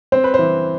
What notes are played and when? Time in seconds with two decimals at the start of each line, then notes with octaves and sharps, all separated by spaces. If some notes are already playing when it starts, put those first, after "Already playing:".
0.12 C4 C5
0.24 B4
0.34 C5
0.39 E3